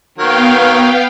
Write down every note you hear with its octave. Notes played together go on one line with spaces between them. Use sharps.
D#3 F#3 B3 A#4 F5 G5